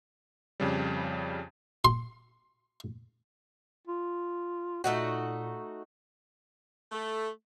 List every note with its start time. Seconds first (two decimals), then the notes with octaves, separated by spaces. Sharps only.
0.60 F2 C#3 G3
1.85 C6
3.87 F4
4.84 A#2 A3 D#4 F#4
6.91 A3